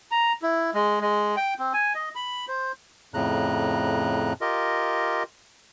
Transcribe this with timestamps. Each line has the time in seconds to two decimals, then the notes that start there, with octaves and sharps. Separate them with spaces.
0.11 A#5
0.42 E4
0.74 G#3
1.01 G#3
1.37 G5
1.59 C4
1.74 G#5
1.95 D#5
2.15 B5
2.48 C5
3.14 F2 A2 C#3 A#5 F#6
4.41 F4 G4 A#4 D#5